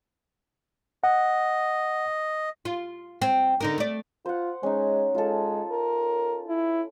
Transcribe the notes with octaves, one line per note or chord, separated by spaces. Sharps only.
D#5 F#5
F4
C4
D3 D#4 A#4
A3 D5
F4 C5 F#5
G#3 C#4 D#4
G#3 F4 A4
A#4
E4